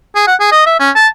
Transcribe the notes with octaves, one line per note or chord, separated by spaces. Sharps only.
G#4
F#5
G#4
D#5
E5
C#4
A5